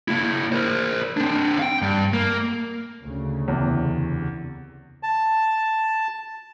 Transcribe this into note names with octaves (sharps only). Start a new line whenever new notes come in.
A#3 E4
A#4 C5
C4 D4
F5 G5
G2
A#3
D2 C#3
E2 C3
A5